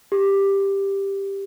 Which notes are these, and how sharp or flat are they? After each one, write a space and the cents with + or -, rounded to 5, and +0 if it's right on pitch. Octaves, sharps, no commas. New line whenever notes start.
G4 +5